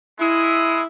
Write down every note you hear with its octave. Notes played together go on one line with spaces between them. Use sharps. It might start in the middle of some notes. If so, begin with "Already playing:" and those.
G#3 E4 D#6